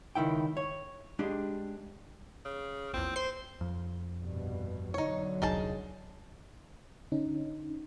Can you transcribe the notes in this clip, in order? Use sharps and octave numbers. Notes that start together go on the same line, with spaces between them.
C#2 D#3 E4 G5
C#5
G#3 D4 G4
C#3
A#1 E2 C4
C5 C7
F2
A#1 G2 B2
B2 D3 F#3 D#4 C#5
E1 C2 D#4 G#4 A5
D3 C#4 D#4